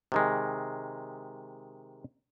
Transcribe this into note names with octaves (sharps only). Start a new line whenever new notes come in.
C3 D#3 G#3